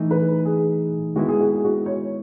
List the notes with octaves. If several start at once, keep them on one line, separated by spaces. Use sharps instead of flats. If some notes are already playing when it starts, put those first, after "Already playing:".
Already playing: E3 A3 D#4
B4
G#4
D#3 G#3 B3 E4 F#4
G#4
F#4
G#4
F#4
C#5